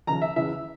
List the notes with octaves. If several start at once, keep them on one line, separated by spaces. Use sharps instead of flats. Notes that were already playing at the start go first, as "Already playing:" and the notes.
D#2 C#3 F3 A#5
E5
E2 C#3 E3 E5